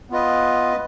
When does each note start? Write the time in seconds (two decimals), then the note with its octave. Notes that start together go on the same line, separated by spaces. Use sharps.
0.10 B3 F4 B4 D#5